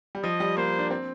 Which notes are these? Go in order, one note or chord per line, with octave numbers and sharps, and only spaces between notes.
G3
F3 D#5
G3
A#3 C5
D4
C4